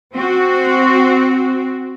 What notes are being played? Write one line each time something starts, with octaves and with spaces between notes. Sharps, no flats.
C4 F#4